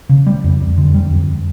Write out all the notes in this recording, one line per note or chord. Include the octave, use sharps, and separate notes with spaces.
C#3
G3
F2
F2
D3
G3
F2